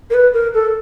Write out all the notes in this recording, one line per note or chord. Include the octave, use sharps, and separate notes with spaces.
A#4
B4
A#4
A4